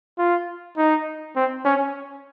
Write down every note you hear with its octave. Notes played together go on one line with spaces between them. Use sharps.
F4
D#4
C4
C#4